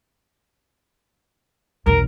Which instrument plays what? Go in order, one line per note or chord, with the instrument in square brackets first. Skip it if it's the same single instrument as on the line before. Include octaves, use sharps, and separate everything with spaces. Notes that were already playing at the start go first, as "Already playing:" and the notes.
[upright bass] B1 E2 [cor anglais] A#4